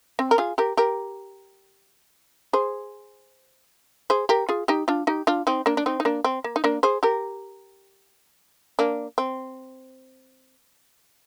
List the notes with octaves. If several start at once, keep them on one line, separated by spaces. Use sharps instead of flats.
C4
A#4
F4 G#4
G4 A#4
G4 A#4
G#4 C5
G#4 C5
G4 A#4
F4 G#4
D#4 G4
D4 F4
D#4 G4
D4 F4
C4 D#4
A#3 D4
D4
C4 D#4
D#4
A#3 D4
C4
A#3
D#4
A#3 D4
G#4 C5
G4 A#4
A#3 D4
C4